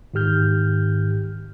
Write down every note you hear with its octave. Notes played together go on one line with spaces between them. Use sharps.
G#2 D#3 G4 F6 G6